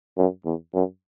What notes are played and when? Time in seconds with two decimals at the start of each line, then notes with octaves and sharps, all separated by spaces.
0.17 F#2
0.45 E2
0.74 F#2